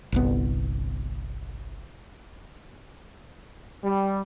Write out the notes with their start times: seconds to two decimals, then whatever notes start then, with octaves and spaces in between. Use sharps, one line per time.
0.12 G1 C2 B3
3.83 G3